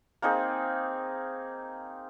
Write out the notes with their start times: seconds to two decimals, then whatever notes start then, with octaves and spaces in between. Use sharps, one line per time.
0.22 A#3 C4 D#4 G#4